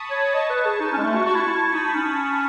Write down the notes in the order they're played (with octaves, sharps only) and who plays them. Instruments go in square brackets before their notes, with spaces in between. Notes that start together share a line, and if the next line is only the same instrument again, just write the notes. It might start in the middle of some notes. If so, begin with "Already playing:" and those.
Already playing: [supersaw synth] A5 B5 C#6 D#6
[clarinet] C#5
[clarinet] D#5 [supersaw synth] A5 C#6
[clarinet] B4
G#4
D#4
C#4
G#3
A3
F#4
[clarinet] F#4 [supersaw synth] A5 C#6
[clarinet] E4
F#4
E4
[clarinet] D#4 [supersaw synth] B5 D#6
[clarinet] C#4